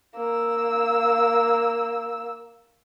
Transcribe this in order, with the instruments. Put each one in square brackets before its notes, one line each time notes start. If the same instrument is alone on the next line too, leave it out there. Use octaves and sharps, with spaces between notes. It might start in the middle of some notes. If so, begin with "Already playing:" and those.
[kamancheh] A#3 E6